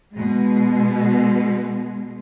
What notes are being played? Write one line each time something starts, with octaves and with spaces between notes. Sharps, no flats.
B2 G#3